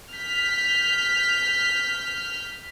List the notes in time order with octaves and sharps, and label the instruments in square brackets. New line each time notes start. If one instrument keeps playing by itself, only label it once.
[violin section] F6 G6 B6